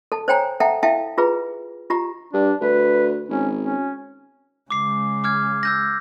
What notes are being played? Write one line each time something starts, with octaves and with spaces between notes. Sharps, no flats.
A4 A5
C5 C#5 G5 G#5 A#5
A4 E5 F#5 G5 A5 A#5
E4 A4 E5 F5 G5 A5
F4 G#4 B4 A#5
F4 G4 A#5
G2 D4
D2 B4
G#1 C#4
C#4
C#3 G#3 D6 C7
D6 F6 G#6
E6 G6 A#6